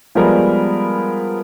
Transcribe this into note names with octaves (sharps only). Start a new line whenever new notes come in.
F3 G3 G#3 B3 A#4